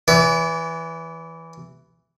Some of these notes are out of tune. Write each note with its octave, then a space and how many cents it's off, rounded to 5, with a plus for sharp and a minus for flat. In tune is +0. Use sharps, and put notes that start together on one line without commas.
E3 +0 D5 -45